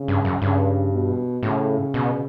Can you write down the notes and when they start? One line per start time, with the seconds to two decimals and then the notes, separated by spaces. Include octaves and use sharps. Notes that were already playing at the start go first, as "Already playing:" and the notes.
Already playing: C#3
0.08 G2
0.25 F#2
0.42 G2 C#3
0.92 B2
1.43 A2 C#3
1.94 B2